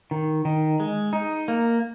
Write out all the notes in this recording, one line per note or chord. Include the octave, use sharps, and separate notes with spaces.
D#3
D#3
G#3
D#4
A#3